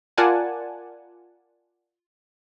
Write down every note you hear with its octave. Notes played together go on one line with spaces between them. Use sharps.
F4 A#4 D5 F#5 G#5 A5